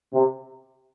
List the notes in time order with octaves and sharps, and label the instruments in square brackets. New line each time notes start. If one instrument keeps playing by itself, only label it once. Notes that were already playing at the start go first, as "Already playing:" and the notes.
[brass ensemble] C3